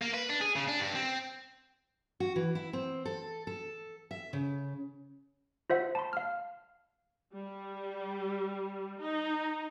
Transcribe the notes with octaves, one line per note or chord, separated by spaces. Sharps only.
A#3
B4
D4
G#4
C#3
D4
G2
C4
F#4
E3
E4
C4
A4
A4
E5
C#3
F4 C5 E5 F#5
A5 B5 C6
F5 F6
G3
D#4